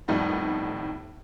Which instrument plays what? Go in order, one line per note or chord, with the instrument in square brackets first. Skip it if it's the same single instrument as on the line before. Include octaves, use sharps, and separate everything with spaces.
[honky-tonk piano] F2 A2 D#3 G3 B3 D#4